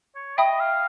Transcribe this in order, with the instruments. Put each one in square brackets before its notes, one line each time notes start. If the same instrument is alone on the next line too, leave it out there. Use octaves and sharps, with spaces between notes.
[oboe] C#5
[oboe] D#5 [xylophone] E5 G5 B5 D#6
[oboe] F5